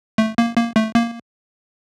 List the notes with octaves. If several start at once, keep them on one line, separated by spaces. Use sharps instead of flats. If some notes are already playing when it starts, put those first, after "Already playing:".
A3
A#3
A#3
A3
A#3